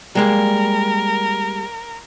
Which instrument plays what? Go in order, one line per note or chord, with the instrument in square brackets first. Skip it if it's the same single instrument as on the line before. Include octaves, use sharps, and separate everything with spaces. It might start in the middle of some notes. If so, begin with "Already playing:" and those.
[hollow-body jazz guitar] G3 G#3 A#3 [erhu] A#4